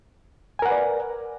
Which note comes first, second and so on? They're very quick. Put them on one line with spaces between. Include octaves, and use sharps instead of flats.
G#5 A#4 F#5 B4 D5